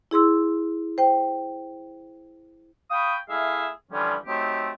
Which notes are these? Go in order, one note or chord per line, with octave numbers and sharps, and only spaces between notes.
E4 G#4 C6 E6
C5 G5
F5 G5 B5 C#6 D#6
A3 E4 G#4 E5 F5
D3 E3 F3 G3 C#4
F#3 A3 C4 D#4 G4